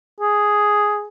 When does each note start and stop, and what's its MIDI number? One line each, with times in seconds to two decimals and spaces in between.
0.21 1.07 68